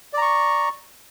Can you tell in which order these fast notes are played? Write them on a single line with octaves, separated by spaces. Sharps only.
D5 A#5 C#6